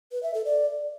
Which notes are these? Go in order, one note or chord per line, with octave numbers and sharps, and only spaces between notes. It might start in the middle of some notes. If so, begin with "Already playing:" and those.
B4
E5
A4
D5